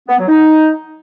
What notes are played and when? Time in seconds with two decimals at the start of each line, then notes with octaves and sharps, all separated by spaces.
0.08 B3
0.18 F#3
0.28 D#4